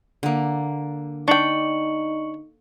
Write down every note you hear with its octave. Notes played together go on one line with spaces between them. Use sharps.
D3 A#3
D4 D#4 G5 C#6 C#7 F#7